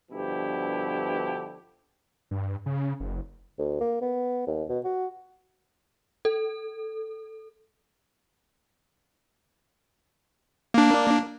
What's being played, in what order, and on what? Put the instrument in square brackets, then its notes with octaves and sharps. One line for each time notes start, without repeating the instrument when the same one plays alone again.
[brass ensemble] G2 B2 D3 F3 E4 G4
[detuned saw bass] G2
C#3
F#1
[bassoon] D2
A#3
B3
D#2
B2
F#4
[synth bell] A4
[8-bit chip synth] A#3 D4